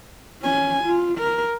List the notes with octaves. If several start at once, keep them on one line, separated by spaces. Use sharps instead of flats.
C#4 G#5
F4
A#4